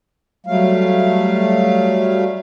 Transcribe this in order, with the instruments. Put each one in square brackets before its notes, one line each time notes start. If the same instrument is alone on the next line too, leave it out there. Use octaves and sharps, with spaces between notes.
[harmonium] F#3 G3 A3 F5